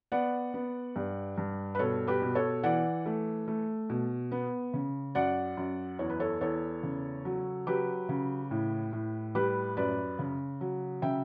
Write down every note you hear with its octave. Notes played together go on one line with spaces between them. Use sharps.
B3 D5 F#5
B3
G2
G2
B4
B2 A4 C#5
G4 B4
B2
A4 C#5
E3 D5 F#5
A3
A3
B2
B3
C#3
F#2 D5 F#5
F#2
E2 C#5
B4
A4 C#5
E2 A4 C#5
C#3
F#3
F#3 G4 B4
C#3
A2
A2
G3 G4 B4
F#2 B4 D5
C#3
F#3
C#3 E5 G5